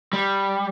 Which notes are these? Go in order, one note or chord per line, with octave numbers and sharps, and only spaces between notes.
G3